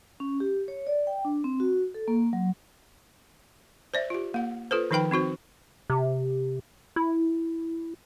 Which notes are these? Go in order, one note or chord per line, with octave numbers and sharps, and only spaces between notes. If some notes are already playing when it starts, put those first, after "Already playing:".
C#4
G4
C#5
D5
G5
D4
C4
F#4
A4
A#3
F#3
C5 D5 E5
F4 G4
A#3 F#5
F4 A4 B4 C5
D#3 F3 D#4 B4 G5 B5
C4 D#4 F#4 C5
C3
E4